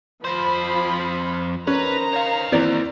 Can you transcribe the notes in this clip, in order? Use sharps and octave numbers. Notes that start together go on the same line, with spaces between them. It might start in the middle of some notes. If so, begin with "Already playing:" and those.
F2 F3 C5 B5
D#3 C#4 B4 C5 A#5
C#5 F5
D#2 E3 C4 D5